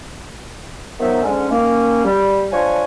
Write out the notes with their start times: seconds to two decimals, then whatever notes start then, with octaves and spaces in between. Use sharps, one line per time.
1.00 D#3 F3 F#3 B3 D#4 E5
1.23 G#2 D3 G#3 C#4
1.50 D#3 A#3 C#4
2.04 G3
2.51 F3 D4 F4 C#5 G#5 C#6